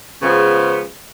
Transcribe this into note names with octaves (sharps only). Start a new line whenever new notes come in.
C#3 F3 G#3 B3